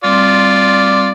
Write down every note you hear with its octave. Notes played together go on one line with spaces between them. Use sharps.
G3 C4 F4 D5 C6